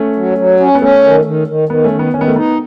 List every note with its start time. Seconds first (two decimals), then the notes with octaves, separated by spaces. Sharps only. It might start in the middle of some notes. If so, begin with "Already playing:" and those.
Already playing: A3 C#4
0.16 F#3
0.38 F#3
0.60 C#4
0.75 B3
0.81 A3 C#4
1.04 D#3
1.25 D#3
1.47 D#3
1.69 D#3 B3
1.84 A3 C#4
1.91 D#3
1.99 B3
2.13 D#3 C#4
2.21 B3
2.28 A3
2.36 B3 D#4